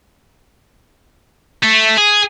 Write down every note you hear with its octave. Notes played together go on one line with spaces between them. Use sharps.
A3
G#4